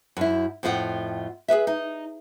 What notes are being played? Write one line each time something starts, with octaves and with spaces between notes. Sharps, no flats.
F#2 E4
F2 A2 F4 F#5 G5
G#4 A4 B4 E5
D#4